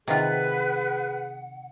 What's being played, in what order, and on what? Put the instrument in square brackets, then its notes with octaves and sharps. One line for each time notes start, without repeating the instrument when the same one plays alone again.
[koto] C3 D#3 F4 [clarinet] G#4 [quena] B4 [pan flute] F#5